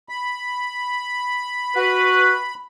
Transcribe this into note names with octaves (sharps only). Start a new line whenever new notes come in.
B5
F#4 B4